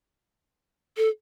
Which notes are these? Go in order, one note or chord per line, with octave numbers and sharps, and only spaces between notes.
A4